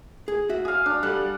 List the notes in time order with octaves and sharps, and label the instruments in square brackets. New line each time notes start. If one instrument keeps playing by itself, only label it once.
[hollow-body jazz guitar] G#4
F#4 E5
[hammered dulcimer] G#4 F5
D4
[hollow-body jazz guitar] G3 A4 [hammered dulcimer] F#5